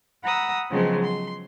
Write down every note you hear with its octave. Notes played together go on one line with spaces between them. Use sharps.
F#5 A#5 B5 D#6 E6
C#3 F3 F#3 G#3 B3 C4
C6